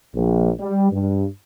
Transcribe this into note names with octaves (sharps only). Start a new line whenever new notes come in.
A#1
G3
G2